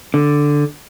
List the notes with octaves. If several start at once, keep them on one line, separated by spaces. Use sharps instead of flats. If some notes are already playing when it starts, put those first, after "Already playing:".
D3